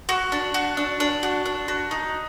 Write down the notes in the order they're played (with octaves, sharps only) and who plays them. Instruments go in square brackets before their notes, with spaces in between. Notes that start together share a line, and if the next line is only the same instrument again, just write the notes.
[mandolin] F#4
D4
F#4
D4
D4
F#4
D4
F#4
D#4